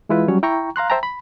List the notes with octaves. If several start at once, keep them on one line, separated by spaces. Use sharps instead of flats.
E3 G#3 E4 F4 B4
F#3 G3 C#4 C#5
E4 G5 A#5 C#6
F5 A#5 C6 F#6
C5 E5 G5 A5 A#5
B5